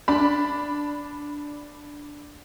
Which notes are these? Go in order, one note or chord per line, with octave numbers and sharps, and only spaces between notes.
D4 B5